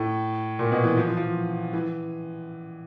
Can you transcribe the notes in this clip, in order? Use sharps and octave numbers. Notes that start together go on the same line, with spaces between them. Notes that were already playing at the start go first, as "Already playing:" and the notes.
Already playing: A2
A#2
B2
E3
F3
E3
F3
E3